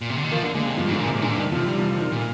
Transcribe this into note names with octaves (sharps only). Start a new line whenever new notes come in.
A#2
C3
D3
D#3
F3 A#3
D3 A#3
D3 G#3
C3
G2 F3
G#2 D3
A#2
C3
G#2
A#2 D3
G#2
G2 D#3
C3 F3
G3
F3
F3
D#3
A#2